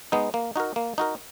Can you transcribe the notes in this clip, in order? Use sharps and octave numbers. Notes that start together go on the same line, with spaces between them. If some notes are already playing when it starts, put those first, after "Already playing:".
G#3 B3 D#4
A#3
D#4 F#4 A#4
A#3
D#4 F#4 A#4